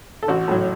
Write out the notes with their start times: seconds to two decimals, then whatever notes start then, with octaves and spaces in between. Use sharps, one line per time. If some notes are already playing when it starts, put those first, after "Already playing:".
0.23 A4
0.28 A1 F#4
0.48 A2 F#3